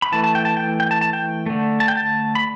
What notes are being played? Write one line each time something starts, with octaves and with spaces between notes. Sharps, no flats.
B5
E3 A3 A5
A5
G5
A5
G5
G5
A5
A5
G5
D3 A3
A5
G5
A5
B5